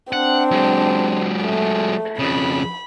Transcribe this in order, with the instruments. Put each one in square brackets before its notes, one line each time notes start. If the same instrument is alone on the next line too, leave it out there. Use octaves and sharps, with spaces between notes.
[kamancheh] C4 D4 [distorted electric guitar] F#5
[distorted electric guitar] F#3 G#3
[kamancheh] A3
[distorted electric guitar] F2 C#3 [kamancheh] B5